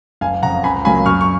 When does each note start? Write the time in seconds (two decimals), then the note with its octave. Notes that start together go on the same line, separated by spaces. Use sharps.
0.21 F#1 F5 G#5
0.42 F2 C#3 F#5 A#5
0.63 C#2 G#5 B5
0.85 C#3 F#3 A#3 G#5 B5
1.06 F#2 C#6 F6
1.21 C#6